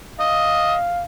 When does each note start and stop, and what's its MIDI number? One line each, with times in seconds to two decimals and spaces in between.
0.20 0.75 75
0.20 1.05 77